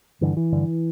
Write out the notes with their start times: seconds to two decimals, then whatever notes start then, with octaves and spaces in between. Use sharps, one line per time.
0.21 G2 D3 E3
0.37 E3
0.52 G2 D3